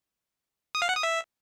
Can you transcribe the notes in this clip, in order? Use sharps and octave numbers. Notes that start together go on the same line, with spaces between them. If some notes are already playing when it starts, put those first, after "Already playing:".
D#6
F5
F#5
D#6
E5